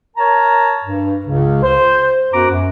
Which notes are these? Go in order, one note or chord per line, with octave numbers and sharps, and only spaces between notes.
A#4 C#5 A5 A#5
G2
C#2 C#3
C5
F#2 B3 F#4 A#5 D6
F#2